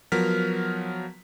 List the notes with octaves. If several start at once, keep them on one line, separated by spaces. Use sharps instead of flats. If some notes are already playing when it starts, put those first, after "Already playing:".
F3 F#3 B3 A#4 F6 B6